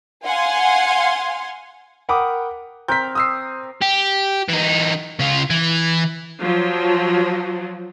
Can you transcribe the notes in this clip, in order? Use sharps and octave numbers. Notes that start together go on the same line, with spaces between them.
F5 F#5 G#5 C6
A#4 F#5 G5 B5 D6 D#6
C4 A#4 D6 G6 B6
D#6 E6 C7
G4
E3 D#4
C#3 F4
E3
F3 F#3